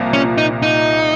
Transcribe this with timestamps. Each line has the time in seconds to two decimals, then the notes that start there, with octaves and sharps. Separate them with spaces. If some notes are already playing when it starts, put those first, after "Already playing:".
Already playing: C2 A#2 F3 A#3
0.13 C#4
0.38 D#4
0.62 D#4